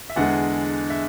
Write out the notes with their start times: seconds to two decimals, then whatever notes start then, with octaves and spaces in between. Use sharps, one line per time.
0.10 E5
0.16 E2 D3 G#3 F#5
0.90 E5